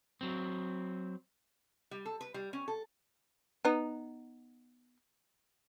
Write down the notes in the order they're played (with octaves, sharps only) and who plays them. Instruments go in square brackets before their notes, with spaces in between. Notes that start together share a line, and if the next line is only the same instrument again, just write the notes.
[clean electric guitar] F#3 C4
[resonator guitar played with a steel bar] G3
A4
B4
G3
C#4
A4
[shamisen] B3 D#4